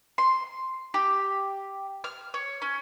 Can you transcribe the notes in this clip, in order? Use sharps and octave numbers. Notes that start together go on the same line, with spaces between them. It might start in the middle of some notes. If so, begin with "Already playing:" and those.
C6
G4
F6
C#5
C#4